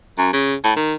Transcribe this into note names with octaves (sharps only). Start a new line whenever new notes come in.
F#2
C#3
A2
D#3